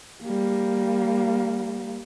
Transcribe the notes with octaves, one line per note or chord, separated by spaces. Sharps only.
G3 A#3